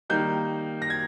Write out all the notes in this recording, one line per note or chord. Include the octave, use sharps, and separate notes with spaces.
D#3 G3 A#3 D#4 G6
A#6
G#6